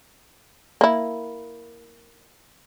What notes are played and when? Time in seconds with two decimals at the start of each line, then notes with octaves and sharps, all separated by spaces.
0.81 A#3 E4